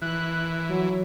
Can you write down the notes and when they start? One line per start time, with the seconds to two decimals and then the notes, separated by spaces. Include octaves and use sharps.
0.02 E3 F#6
0.69 F#3